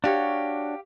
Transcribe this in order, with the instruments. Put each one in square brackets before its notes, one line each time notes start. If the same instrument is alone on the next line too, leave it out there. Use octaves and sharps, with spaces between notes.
[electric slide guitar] D4 F#4 C#5 [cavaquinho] G4 F5